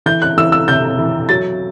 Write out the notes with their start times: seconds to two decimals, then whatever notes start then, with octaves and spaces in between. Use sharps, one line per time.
0.06 E3 G6
0.22 F#6
0.37 E3 E6
0.52 E6
0.68 C3 G6
0.99 E3
1.29 F#3 A6